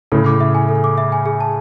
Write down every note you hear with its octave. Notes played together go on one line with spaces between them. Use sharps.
A2 C#3 A4
D6
E5
G#5
A4
D6
E5
G#5
G#4
A5